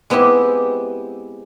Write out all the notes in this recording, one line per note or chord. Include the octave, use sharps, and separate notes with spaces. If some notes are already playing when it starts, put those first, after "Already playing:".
G#3 B3 C4 E4 G4